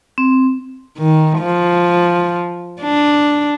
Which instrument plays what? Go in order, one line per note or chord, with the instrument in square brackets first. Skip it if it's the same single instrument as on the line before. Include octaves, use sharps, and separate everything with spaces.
[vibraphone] C4
[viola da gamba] D#3
F3
D4